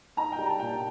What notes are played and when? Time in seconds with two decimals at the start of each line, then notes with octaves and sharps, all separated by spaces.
0.17 D#4 A#5
0.32 G5
0.38 G3
0.46 A5
0.59 A#2 G5